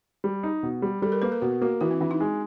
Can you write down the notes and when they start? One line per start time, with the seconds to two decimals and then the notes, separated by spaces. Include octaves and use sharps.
0.24 G3
0.43 D#4
0.63 B2
0.82 G3
1.02 G3 A4
1.12 A#4
1.22 A#3 B4
1.32 A#4
1.42 B2 F#4
1.61 A#3 F#4
1.81 E3 F#4
1.91 C4
2.01 E3 D4
2.11 D#4
2.21 G#3